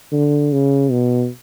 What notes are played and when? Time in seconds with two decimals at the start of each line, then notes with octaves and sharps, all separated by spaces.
0.12 D3
0.52 C#3
0.91 B2